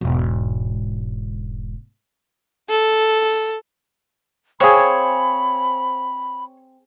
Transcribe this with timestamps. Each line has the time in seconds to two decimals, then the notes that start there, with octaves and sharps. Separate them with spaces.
0.01 E1 G#2
2.70 A4
4.60 C4 G#4 C5 C#5 F5 G#5 B5